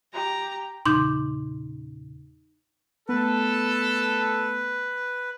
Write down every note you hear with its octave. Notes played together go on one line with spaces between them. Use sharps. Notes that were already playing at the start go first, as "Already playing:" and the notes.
G4 A#5
E2 A#2 C#3 D#4 C6 D6 G6
A3 B3 A4 B4